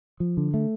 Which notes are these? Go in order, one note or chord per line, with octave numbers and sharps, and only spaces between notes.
F3
D3
A3